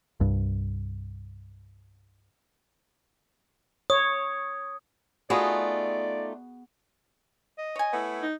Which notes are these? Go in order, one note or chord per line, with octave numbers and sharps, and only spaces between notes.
C2 G2
C#5 D#6
A3 B3 D#4 F4 F#4 G#4 D5
D#5
C#5 G#5
A3 B3 E4
D#4